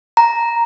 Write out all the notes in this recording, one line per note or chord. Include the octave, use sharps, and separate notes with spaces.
A#5